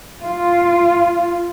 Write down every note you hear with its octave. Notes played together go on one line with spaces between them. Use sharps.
F4